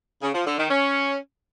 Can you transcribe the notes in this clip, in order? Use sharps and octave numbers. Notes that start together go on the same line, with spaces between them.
C#3
F3
D3
D#3
C#4